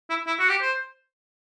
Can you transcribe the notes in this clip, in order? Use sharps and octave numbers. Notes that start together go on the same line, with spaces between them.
E4
E4
F#4
G4
C5